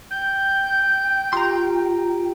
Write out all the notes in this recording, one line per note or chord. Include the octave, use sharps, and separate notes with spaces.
G5 G6
F4 G4 A#5 C6